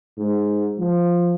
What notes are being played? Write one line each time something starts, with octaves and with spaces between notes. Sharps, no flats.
G#2
F3